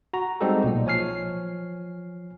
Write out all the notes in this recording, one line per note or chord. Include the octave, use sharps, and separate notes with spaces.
F#4 A#5
G3 G#3 C4 D#4 G4 A4
B1 A#2 D#5
F3 C#5 G#5 F6 C7